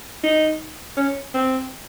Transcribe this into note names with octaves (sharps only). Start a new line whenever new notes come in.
D#4
C#4
C4